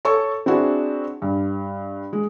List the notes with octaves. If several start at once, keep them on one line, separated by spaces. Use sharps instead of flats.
A4 C#5 C#6
C4 D4 E4 F#4 G#4
G2
G#3